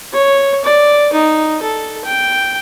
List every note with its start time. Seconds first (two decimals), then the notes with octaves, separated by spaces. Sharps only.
0.13 C#5
0.64 D5
1.13 D#4
1.62 A4
2.04 G5